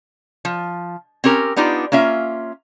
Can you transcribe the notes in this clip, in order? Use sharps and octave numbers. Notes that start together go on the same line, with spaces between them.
F3
C4 C#4 G4 A#4
B3 D4 D#4 F4 G4
A#3 C#4 F4 E5